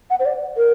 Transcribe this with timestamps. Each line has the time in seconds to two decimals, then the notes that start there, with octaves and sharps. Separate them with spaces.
0.10 F#5
0.20 C5
0.25 D5
0.57 A#4